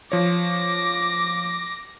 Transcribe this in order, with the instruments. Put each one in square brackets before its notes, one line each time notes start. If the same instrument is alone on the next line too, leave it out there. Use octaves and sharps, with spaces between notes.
[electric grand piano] F3 C#5 [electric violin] D6 A#6